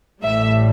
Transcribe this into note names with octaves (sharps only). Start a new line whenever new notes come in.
A1 A2 G3 E5